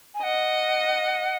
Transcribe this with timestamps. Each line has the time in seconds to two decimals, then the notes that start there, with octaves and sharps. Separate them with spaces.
0.14 G#5
0.23 D#5 F#5